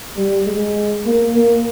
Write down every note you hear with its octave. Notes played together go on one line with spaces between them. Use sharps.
G3
G#3
A#3
A#3